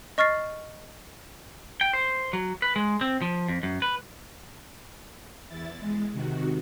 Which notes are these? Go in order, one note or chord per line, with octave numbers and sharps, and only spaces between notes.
D#5 C#6 F6 A6 C7
G5
C5
F#3
B4
G#3
C4
F3
F2
F#2
B4
E2 E4 A6
G#3
C3 D#3 F#4